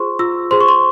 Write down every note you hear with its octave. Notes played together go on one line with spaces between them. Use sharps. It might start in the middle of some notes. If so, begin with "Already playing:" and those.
Already playing: F4 G#4 C5 C6 C#6
F4 E6
G#4 C5 C6
C#6
C6